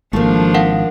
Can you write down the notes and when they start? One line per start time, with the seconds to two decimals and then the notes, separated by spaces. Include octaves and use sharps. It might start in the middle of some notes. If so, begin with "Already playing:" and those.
0.13 G#1 F3 A3 A#3 D4
0.54 A#4 F5 F#5